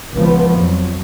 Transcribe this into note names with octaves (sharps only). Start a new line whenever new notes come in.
C#2 D#3 F3 A3 B3
F2 F#3